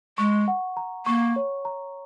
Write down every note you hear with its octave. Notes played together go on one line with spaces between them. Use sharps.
G#3 C#6
F#5
A#5
A#3 C#6
C#5
A#5